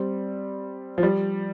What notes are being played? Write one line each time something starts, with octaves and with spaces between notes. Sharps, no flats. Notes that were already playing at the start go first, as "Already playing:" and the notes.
Already playing: G3 C4
F3
G3